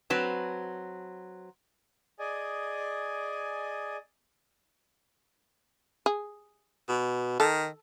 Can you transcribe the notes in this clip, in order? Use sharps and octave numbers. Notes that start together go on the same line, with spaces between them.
F#3 C4 B4 A5
G#4 D5 D#5 G#5
G#4
B2
D#3 A4